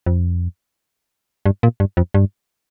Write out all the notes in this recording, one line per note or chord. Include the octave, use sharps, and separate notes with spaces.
F2
G2
A#2
G2
F2
G2